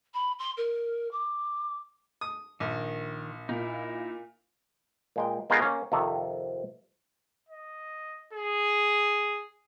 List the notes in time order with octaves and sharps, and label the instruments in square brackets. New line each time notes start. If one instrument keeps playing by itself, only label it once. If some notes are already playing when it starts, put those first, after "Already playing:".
[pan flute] B5
C6
A#4
D6
[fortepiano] D#6
[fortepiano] A#1 [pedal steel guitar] D#3
[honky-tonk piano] A#2 [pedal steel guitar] D#4 E4
[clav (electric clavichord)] A#2 G#3 G5
G#3 B3 D#4 F4 G#4 A#4
A#3 C#4
F2 C3 D#3 A4
[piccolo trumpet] D#5
G#4